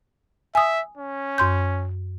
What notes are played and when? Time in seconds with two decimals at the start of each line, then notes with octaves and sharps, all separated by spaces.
0.55 E5 G#5 D#6
0.97 C#4
1.38 F#2 C6 G6